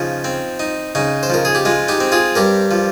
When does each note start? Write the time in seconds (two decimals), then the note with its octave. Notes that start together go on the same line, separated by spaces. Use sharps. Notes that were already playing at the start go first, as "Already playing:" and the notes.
Already playing: C#3 F3 D#4
0.24 C4
0.59 D#4
0.95 C#3 D#4
1.23 C5
1.30 F3 A#4
1.45 G#4
1.55 G4
1.65 G#3 F4
1.88 D#4 G4
2.00 C4
2.12 F4 G#4
2.35 G2 G4 A#4
2.71 F3